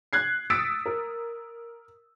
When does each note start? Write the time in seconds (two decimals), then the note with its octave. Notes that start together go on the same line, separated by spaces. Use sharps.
0.13 F#6 G#6 C7
0.50 D#6 E6 A6 B6 C#7 D7
0.86 A#4